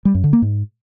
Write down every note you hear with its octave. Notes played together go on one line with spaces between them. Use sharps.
G3
F#2
D3
A#3
G#2